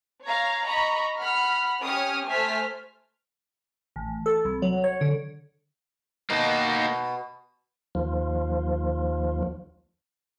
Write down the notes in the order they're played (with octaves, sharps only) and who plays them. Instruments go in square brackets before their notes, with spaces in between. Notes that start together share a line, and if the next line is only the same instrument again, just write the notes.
[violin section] C#5 F5 A#5
D#5 A#5 B5 C#6
F#5 B5 F6
C#4 G4 C#5 D#6 F6
A3 C5 G#5 F6 B6
[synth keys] A1
A4
C2
F#3
C#5
D3
[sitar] B2 [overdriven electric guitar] A#3 D#4
[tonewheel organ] D#2 F3